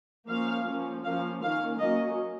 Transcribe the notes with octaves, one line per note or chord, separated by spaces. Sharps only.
F3 A#3 C#4 F5
F3 A#3 C#4
F3 A#3 C#4 F5
D#3 A#3 C#4 F5
F#3 A#3 C#4 D#5